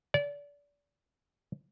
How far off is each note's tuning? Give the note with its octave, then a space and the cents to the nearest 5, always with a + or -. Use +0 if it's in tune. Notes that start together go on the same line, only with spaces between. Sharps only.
D5 -30